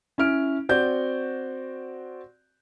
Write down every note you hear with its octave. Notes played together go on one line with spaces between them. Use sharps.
C#4 E4 F6 D7
C4 F#4 D5 G6